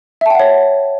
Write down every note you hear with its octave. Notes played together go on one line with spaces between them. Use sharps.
C#5 E5 F#5 G5 A5